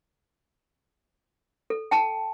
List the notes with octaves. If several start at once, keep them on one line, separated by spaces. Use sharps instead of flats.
A4
G5 A5